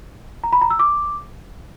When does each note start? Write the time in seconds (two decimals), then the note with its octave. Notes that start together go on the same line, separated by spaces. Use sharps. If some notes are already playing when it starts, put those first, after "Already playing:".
0.44 A#5
0.53 B5
0.61 A#5
0.70 E6
0.79 D6